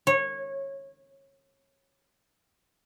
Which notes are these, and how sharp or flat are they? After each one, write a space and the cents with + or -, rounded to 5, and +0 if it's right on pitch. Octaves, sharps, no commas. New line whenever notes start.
C#5 -20